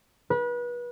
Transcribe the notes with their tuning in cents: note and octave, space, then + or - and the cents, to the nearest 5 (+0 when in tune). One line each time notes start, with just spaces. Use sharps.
B4 -30